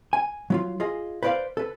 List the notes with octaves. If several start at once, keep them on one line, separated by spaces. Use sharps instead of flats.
G#5
F#3 E4 F4
F4 G#4 D#5
B4 C5 D5 E5 F5
A4 B4